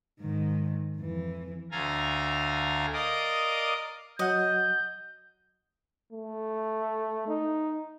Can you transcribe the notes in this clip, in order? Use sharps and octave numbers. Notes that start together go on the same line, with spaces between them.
G#2 D#3
F2 E3
D2 A4 F5 G#5 A#5
A#4 D5 D#5 F5 D6 D#6
F#3 D#5 F#5 G6
A3
D#4